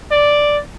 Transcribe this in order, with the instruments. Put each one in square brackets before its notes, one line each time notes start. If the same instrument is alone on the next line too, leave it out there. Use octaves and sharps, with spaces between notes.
[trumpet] D5